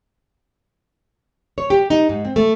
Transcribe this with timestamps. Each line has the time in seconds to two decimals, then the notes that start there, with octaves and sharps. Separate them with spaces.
1.58 C#5
1.70 G4
1.90 D#4
2.09 G#2
2.25 C4
2.36 A3